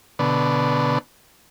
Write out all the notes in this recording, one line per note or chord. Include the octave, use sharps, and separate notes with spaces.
B2 D3